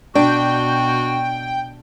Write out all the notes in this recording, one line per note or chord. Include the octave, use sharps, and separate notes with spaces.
B2 D4 F#4 G5